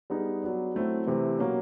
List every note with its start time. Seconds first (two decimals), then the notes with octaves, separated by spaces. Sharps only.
0.10 G3 B3 D#4 G#4
0.42 F#3 B3 D4
0.75 F#3 A3 C4 E4
1.07 C3 E3 A3 C4
1.39 B2 F#3 A#3 C#4